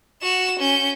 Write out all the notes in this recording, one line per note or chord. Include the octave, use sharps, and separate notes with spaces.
F#4 E7
C#4 G6